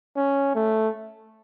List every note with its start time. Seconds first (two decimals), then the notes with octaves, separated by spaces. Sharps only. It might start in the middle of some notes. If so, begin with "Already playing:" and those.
0.16 C#4
0.55 A3